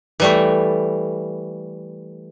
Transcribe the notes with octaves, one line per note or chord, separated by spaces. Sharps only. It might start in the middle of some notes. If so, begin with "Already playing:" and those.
E3 G3 A3